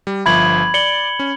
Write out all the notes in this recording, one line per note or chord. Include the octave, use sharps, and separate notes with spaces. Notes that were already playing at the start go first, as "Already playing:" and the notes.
G3
G1 F3 E5 B5 G#6 F#7
D5 C#7 F#7 G7
C#4